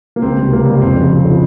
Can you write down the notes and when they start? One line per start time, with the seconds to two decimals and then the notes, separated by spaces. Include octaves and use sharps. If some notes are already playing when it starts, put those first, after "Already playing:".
0.16 A#3
0.22 C#2 C4
0.37 G3
0.42 C3
0.52 C#2 A#3
0.66 C3 G3
0.81 F2 C4
0.96 C#3 F3
1.10 F2
1.25 C#3 F3